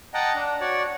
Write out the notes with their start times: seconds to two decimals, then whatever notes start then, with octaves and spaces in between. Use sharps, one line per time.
0.14 D#5 F#5 G5 A5 A#5
0.35 D4
0.61 F#4 C#5 D5